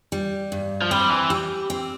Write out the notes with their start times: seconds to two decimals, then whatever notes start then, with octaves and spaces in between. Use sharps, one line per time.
0.12 G3
0.52 G2
0.82 F3
0.91 G3 C4
1.10 E3
1.30 G4
1.70 C4